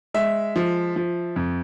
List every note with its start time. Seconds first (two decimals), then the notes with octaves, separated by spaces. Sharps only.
0.14 G#3 E5
0.56 F3
0.96 F3
1.36 F2